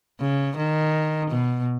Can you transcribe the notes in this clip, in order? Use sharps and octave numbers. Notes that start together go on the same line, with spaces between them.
C#3
D#3
B2